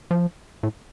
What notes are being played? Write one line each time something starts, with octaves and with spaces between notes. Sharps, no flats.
F3
A2